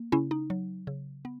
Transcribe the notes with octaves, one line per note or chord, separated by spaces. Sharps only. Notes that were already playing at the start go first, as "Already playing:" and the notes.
Already playing: A#3
C#3 C#4 E4
D#4
F#3
C#3
B3